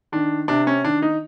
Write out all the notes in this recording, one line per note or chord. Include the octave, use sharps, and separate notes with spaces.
D#3 D4
C3 D4
C#4
D#3 D4
D#4